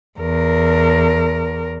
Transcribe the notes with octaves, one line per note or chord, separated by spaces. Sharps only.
E2 A#4